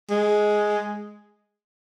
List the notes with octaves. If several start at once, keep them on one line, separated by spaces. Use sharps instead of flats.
G#3